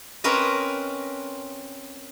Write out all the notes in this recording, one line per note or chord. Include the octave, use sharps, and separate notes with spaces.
C4 C#4 A#4 B4 D#5